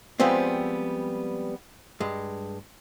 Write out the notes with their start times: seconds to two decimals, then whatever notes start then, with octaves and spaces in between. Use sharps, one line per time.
0.20 F3 G3 G#3 B3 C4
2.00 G2 G#3